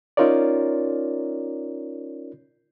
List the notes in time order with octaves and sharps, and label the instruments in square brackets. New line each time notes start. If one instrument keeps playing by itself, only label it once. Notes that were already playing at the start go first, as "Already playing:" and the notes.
[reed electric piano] C#4 D#4 F4 A#4 C#5 D5